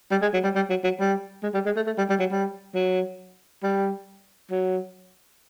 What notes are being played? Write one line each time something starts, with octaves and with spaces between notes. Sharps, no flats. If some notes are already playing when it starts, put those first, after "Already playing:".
G3
G#3
F#3
G3
G3
F#3
F#3
G3
G#3
G3
G#3
A3
A3
G3
G3
F#3
G3
F#3
G3
F#3